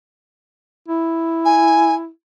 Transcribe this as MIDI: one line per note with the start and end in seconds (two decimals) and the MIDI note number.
0.88 2.09 64
1.45 1.94 80